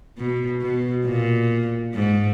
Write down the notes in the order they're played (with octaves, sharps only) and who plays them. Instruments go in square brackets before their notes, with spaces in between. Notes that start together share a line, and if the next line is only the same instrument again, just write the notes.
[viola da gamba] B2
B2
A#2
G#2